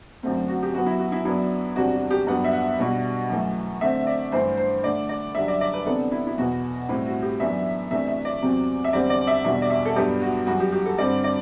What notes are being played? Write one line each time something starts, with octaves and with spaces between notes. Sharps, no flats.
F#2 D3 A3 C4
F#4
G4
F#2 F#3 B3 F#4
E4
F#4
E4
F#2 F#3 B3 D4 E4
E2 C3 G3 D4 F#4
F#4
G4
G2 F#3 B3 D4 F#5
E5
F#5
B2 G3 D4
F#2 E3 A3
D3 A3 C4 E5
D5
G2 E3 A3 C5
C5
D3 A3 D4 D5
D5
F#2 D3 G3 D4 E5
D5
D5
B4
C3 E3 B3 D4 A4
E4
E4
E2 B2 F#3 B3 F#4
A2 G3 C4 E4
F#4
G4
F#2 E3 B3 D4 E5
C3 E3 A3 D4 E5
E5
D5
E2 C3 F#3 C4
E5
E2 D3 G3 C4 D5
D5
E5
E2 B2 G3 D4 E5
D5
E5
A4
G2 F#3 B3 D4 G4
F#4
F#2 E3 G3 F#4
G4
G4
A4
G2 D3 G3 C4 D5
D5